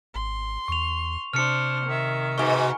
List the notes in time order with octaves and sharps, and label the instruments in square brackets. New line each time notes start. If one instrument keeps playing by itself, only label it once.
[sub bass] G#1 [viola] C6
[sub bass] E2 [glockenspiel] C#6 F7
[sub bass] C3 [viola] D4 C5 [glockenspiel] F6 C#7
[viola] D#3 E5
[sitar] G#2 B2 [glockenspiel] G#5 C#6